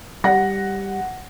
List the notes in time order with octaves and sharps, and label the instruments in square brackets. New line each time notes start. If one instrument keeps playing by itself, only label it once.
[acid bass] G3 [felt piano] F#5 A#6